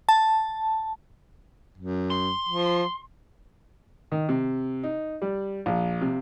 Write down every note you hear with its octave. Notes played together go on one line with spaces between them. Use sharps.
A5
F#2
C6
F3
D#3
C3
D#4
G3
A#1
C3